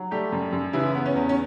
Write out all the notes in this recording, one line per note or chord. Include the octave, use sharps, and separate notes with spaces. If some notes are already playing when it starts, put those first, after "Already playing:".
Already playing: F#3
G3 A3 G4
F#2
F#2
C#3 E3 E4
B3
C#4
E2
C#4